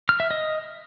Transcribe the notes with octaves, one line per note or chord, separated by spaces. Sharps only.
F6
E5
D#5